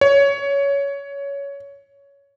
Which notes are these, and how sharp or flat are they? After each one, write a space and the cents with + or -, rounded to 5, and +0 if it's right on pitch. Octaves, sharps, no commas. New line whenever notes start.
C#5 +15